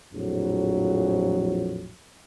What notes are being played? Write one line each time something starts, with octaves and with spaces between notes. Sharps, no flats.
A#1 F2 A2 F#3